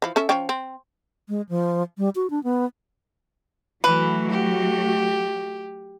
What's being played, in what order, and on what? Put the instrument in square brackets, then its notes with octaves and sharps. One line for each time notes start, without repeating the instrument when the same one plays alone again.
[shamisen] E3 F3
C#4 A4 E5
F3 C#4 G5
C4
[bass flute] G#3
F3
G3
F#4
D4
B3
[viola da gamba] E3 [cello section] F#3 A3 F#4 [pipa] B4
[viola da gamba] G4